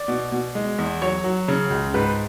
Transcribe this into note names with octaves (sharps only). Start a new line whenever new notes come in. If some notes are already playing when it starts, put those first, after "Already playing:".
Already playing: D5
B2
B2
G#3
E2
F#3 C#5
F#3
C#3
C#2
G#2 B4